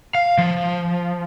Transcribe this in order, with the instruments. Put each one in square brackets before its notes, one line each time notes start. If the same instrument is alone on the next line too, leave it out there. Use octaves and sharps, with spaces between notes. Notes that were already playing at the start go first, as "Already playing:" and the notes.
[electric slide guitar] F5
F3